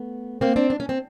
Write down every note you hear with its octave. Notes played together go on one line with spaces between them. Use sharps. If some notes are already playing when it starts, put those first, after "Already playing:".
Already playing: A3 B3
A#3 C4
C4 D4
D4
C#4
C4